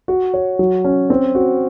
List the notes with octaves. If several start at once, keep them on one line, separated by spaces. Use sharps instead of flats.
F#4
C#5
F#3
C#4
C4
F#4